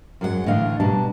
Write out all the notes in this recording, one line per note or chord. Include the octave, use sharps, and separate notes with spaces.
F#2 F#3 G#3 F#4 F#5
A2 D3 E3 D4 D#5 F5
B2 G3 D4 A5 A#5